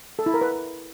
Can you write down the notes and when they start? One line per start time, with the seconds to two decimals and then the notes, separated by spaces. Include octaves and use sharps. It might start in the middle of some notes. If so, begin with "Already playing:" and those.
0.19 A4
0.26 E4
0.34 A#4
0.41 B4